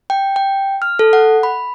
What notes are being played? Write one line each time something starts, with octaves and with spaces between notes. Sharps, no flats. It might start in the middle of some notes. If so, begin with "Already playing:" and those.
G5
G5
F6
A4
F#5
B5